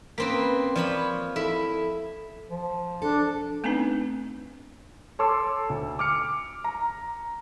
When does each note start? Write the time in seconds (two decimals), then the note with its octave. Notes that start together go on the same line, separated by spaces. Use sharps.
0.18 A#3 C4 C#4 B4 C6 B6
0.76 F3 C#5 D5 B5
1.36 E4 A4 B6
2.50 F3
3.02 D4 A4
3.64 A3 B3 C4 D4 D#4 B4
5.19 A4 C#5 A5 C6 D6 E6
5.70 D2
5.99 D6 F6 C#7
6.64 A#5